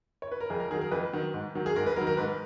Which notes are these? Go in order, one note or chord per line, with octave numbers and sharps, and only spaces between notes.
C#5
B4
A#4
F2 G#4
A#4
D#3 F#3 G#4
A#4
F2 B4
D#3 F#3
G#2
D#3 F#3
G#4
G#2 A#4
B4
D#3 F#3 A#4
A#4
G#2 B4